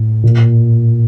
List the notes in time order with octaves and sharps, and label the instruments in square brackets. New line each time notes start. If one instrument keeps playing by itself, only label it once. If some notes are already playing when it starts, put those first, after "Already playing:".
Already playing: [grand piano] A2
A#2